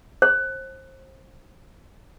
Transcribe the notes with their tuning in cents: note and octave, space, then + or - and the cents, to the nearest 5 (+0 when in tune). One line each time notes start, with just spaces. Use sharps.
C5 +30